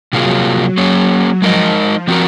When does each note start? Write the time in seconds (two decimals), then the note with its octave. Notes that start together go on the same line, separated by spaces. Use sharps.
0.13 C3 F3 F#3 A#3 F4 G#4
0.77 A#3 C#4 G#4 C#5
1.42 F3 G#3 D#4 A#4 D#5
2.08 F3 C4 F#4 A#4